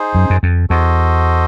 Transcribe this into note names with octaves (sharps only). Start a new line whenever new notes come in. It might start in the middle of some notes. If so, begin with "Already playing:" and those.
Already playing: D#4 G#4 C5
F#2
F#2
F2
E2 F#4 A4 C5 D#5